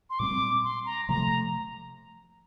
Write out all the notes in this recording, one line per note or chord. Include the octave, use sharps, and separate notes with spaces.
C6
A#2 G3 C4 D6
C6
A#5
C3 F3 A3 A#5